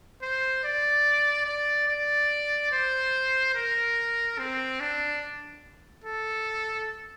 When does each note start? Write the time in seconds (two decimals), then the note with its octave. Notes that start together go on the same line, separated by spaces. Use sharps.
0.22 C5
0.64 D5
1.46 D5
1.88 D5
2.72 C5
3.55 A#4
4.38 C4
4.80 D4
6.04 A4